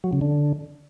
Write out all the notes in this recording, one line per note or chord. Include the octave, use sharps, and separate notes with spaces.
F#3
C#3
D3